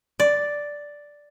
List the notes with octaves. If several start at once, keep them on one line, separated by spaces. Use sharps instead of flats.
D5